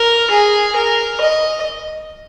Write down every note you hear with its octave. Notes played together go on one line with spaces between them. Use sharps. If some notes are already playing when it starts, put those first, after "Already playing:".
Already playing: A#4
G#4
A#4
D#5